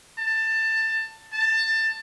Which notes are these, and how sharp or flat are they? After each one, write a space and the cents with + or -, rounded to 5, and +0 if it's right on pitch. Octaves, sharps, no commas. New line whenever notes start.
A5 +15
A5 +20